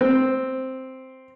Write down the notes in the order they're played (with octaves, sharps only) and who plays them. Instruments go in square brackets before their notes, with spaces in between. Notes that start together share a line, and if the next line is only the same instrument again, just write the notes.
[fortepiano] C4